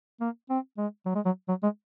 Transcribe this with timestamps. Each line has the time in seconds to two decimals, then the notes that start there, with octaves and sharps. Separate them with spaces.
0.20 A#3
0.50 C4
0.78 G#3
1.05 F#3
1.15 G#3
1.25 F#3
1.48 F#3
1.63 G#3